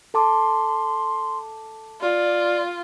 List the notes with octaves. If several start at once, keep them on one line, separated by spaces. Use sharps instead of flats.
A4 A5 C6 D6
F4 D5